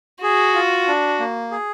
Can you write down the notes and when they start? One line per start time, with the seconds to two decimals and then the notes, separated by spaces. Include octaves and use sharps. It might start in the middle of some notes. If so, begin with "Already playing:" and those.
0.23 F#4 G#4
0.55 F4
0.87 D4
1.19 A#3
1.51 G#4